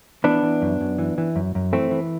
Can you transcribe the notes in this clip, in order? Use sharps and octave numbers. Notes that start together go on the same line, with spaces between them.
E3 B3 D4
E3
F#2
F#2
E3
E3
F#2
F#2
E3 A3 C4
E3